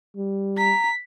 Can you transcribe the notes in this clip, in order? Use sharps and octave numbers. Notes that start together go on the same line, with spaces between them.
G3
A#5 B6